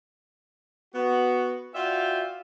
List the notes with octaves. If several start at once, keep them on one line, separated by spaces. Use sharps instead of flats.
B3 F#4
F4 F#4 D5 E5 F5 G5